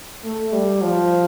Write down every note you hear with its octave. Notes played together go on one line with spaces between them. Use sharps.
A3
G3
F3